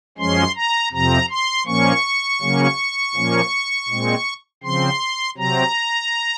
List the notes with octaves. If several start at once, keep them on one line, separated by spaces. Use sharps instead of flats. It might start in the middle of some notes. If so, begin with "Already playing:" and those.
F#2 F3 G#3 C#4 C6
A#5
F2 C3 F3 C4 A#5
C6
A#2 F3 A#3 C#4 C#6
C#3 F#3 A#3 C#4
A#2 F3 A#3 C#4
A#2 G#3 C4
C#3 F3 C4 C6
C3 F#3 C4 A#5